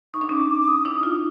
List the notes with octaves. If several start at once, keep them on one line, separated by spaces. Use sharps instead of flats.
D#4 C#6
D4
C#4 D#4 D6
D6
D6
D#6
D4 E4
D#4 F4